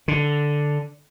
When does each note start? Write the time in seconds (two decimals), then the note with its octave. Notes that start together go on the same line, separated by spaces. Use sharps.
0.08 D3